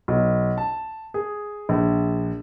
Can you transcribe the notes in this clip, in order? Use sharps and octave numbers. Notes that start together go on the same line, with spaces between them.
B1
A5
G#4
A#1